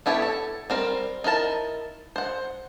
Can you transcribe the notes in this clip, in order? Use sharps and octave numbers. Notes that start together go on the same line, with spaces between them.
B3 E4 G4 A4 C#5
A4
G3 C4 A#4
D#4 E4 A#4 A5
C5 F#5